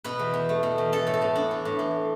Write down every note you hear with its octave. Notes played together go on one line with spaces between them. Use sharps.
B2 B4
E2
E2
A3
B2
E2
E3 A4
A2
A4
A2
B3 D4
E3
A2
E3